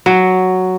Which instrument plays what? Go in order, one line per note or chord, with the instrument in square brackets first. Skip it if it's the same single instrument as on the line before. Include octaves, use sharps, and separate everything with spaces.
[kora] F#3